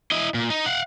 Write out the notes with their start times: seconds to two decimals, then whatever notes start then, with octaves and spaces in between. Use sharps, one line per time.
0.11 E4 D#5
0.34 A#2
0.50 D#4
0.66 F5 F#5